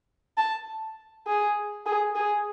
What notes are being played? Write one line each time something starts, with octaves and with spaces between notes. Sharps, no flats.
A5
G#4
G#4
G#4